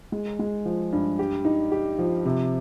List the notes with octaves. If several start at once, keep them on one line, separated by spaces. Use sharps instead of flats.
G#3
G#3
F3
G2
G4
D#4
G4
F3
C3